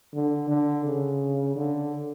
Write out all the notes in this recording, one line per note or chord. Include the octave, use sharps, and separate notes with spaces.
D3
D3
C#3
D3